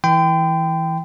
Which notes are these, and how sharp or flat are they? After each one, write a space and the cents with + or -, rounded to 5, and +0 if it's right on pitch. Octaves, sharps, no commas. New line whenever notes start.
E3 -10 G5 +0 C6 -45